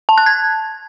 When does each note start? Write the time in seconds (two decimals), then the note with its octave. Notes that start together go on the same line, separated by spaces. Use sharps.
0.09 A5
0.18 F#6
0.26 G#6